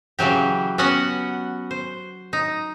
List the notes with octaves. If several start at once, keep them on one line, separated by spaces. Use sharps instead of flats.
C#3 E3 F#3 G4
B3 C#4 F#4 F#5
C5
D#4